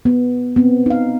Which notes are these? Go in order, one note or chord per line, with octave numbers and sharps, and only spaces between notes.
B3
B3 C4
D#4 F5